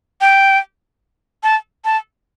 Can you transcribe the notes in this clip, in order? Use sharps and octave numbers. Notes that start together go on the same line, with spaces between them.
G5
A5
A5